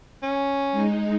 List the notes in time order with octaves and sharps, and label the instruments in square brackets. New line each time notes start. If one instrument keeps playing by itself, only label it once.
[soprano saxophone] C#4
[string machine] G#3 D#4